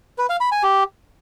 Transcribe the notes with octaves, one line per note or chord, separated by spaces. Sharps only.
B4
F5
B5
G#5
G4